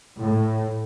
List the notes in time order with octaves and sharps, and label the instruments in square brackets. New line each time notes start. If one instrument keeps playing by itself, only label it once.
[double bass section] A2